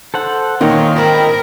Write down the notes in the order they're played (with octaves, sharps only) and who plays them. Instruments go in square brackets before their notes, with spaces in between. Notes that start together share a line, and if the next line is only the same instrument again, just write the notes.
[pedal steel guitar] A4 C5 F#5
[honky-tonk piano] A#2 D#3 [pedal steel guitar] F4 C#5 D#5 [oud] A#4
[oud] G#2 C4 D4 [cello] A#4 [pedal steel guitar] D#5 B5